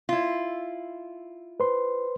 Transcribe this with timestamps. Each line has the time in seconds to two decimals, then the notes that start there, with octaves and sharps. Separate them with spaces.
0.09 E4 F4
1.60 B4 C5 C6